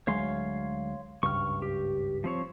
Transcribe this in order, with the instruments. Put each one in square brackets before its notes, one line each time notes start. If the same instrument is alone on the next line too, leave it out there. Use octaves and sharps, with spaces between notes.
[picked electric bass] D2 F#3 G#3 [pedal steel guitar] C#5 F5 C6
[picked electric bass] G#1 C#2 G2 [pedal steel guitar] C#6 F6
[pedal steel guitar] G4
F3 C4 C#5